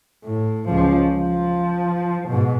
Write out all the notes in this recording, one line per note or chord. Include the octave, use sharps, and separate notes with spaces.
A2
C#2 F3
F3
G#2 B2